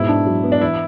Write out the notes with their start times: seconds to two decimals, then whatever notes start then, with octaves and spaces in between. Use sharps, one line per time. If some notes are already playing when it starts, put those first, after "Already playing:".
Already playing: G#2 B2 E4
0.09 D4
0.27 F#3
0.44 B3
0.52 D4
0.61 E3 E4